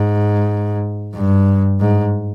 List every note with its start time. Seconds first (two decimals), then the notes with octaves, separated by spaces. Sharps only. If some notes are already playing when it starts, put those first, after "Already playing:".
Already playing: G#2
1.14 G2
1.80 G#2